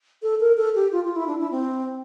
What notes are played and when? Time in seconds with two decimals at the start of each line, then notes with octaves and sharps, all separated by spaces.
0.23 A4
0.40 A#4
0.57 A4
0.75 G4
0.92 F4
1.04 F4
1.16 E4
1.28 D4
1.39 E4
1.51 C4